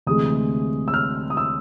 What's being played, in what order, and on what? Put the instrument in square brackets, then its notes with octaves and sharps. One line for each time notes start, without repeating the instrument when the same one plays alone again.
[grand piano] D2 C3 E3 G#3 D#6
E6
F6
D#6
E6